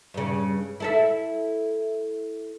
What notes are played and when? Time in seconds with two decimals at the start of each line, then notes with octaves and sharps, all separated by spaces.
0.14 G2 C#3
0.80 E4 A4 E5